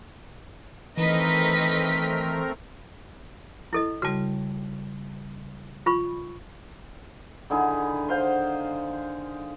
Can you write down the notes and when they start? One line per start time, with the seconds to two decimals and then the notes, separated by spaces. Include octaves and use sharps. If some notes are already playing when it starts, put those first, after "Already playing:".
0.97 E3 A3 C4 D#4 A#4 B4 D#5 B6
3.73 E4 A4 D#5
4.02 C#3 G3 F#4 A5
5.86 F4 B5 C#6
7.50 D3 D#3 E4 G#4
8.09 C5 F5 F#5 C6